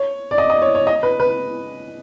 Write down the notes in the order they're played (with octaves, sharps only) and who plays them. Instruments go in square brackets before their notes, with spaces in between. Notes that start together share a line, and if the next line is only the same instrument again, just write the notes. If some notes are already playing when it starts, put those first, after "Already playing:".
Already playing: [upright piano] C#5
D5
D#5
D#5
C#5
C#5
D#5
B4
B4